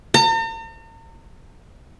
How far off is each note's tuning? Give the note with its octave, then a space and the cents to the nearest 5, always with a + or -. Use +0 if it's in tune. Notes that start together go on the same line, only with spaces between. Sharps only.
A#5 -45